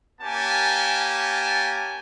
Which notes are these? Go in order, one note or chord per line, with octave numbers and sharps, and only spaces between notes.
A#3 C#4 G4 G#5 A5